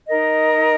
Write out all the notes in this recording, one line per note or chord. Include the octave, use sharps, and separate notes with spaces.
D#4 A#4 D#5